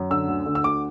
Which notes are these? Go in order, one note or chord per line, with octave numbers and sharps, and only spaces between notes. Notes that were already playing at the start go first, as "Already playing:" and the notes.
Already playing: F#2
D3 E6
D2
D3
E6
D2 D6